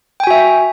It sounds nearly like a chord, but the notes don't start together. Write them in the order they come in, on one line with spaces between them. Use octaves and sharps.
G5 G#5 F#4 E5